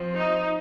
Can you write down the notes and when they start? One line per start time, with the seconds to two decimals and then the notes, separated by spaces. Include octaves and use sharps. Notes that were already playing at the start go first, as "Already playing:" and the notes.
Already playing: F3 C4
0.16 D#4